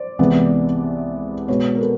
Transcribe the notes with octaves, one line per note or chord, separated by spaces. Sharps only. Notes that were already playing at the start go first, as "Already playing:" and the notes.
Already playing: C5 D5
C2 C3 E3 G#3 B3
B2 G#3 B3 B4 C#5
A#4
A4 B4